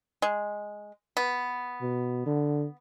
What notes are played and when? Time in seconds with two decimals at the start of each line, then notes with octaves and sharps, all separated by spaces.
0.22 G#3
1.17 B3
1.82 B2
2.26 D3